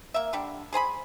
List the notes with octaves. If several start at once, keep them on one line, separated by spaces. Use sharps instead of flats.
A#3 E5
D3 G3 D4
G#4 C5 G#5 B5